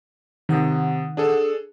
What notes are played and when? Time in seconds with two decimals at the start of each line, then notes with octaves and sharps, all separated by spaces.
0.49 C3 D#3 F#5 D#6
1.17 D4 G#4 A4